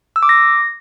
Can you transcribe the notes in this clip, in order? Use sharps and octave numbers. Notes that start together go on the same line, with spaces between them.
E6
D6
A#6